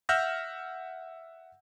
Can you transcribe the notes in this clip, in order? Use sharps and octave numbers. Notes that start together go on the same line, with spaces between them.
E5 F#5 E6 F6 G6 A#6